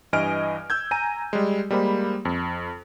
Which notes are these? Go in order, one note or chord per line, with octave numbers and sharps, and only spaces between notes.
G2 E3 D#5 G#5 F6 D7
E6 G6 G#6
G#5 A#5 D#7
G3 G#3
G3 G#3 A#3 C5 B5
F2